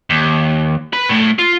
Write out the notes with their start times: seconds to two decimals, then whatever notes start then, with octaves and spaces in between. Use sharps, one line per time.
0.10 D#2
0.93 B4 B5
1.09 A2 A3
1.39 F4